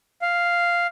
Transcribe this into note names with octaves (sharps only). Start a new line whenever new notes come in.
F5